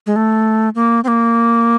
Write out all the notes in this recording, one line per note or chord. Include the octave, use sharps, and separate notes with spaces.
G#3
A3
A#3
C4
A#3